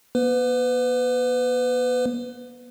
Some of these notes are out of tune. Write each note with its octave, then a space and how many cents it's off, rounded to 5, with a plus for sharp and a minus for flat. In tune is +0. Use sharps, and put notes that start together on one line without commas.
B3 -45 B4 +30